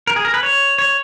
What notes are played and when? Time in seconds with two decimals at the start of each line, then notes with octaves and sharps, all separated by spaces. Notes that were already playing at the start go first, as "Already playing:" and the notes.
0.07 A#4
0.16 G#4
0.25 A#4
0.34 B4
0.43 C#5
0.79 C#5